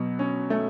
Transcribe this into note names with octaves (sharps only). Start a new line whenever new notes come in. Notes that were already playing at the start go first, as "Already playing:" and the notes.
Already playing: B2 F#3
C#4
A3